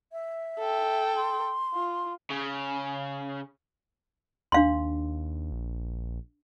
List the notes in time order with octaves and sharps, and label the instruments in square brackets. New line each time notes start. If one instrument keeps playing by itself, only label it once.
[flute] E5
[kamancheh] A4 G5
[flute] C6
[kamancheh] F4
[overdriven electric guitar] C#3
[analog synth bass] D#2 [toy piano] D4 F5 C6
[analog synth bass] A#1